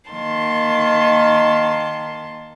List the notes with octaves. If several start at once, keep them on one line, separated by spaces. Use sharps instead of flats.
D#3 A#3 A5 C6